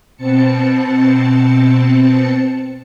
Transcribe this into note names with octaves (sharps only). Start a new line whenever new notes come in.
B2 C4 A5 C#7